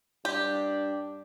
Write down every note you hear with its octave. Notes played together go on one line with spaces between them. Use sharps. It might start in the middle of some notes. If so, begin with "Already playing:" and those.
G2 D4 G4